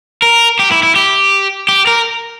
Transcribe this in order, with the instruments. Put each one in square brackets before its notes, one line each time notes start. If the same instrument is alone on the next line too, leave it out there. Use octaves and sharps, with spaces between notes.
[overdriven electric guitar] A#4
G4
E4
E4
G4
G4
A#4